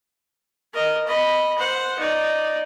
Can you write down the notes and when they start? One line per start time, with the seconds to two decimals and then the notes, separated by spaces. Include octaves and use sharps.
0.73 A#4 D#5
1.07 D#5 B5
1.58 C5 F#5
1.99 D#4 D5